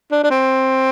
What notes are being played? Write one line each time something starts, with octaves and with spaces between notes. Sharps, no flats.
D4
D4
C4